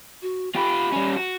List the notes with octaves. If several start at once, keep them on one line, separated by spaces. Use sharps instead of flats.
F#4
F4 G4 B5
G3 C#4
F#4